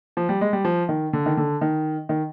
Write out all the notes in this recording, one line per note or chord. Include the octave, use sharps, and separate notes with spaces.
F3
G3
G#3
G3
F3
D#3
D3
D#3
D3
D#3
D#3